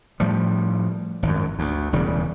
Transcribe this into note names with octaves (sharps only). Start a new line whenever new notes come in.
A2 F3 G3
G#1 F#2
D2
E1 E2 C#3 G3